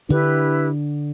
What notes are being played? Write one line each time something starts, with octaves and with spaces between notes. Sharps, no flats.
D3 D4 E4 G4 B4